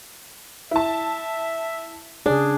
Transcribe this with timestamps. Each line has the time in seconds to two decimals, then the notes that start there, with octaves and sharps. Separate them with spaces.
0.71 E4 E5 A5
2.26 C#3 D4 G#4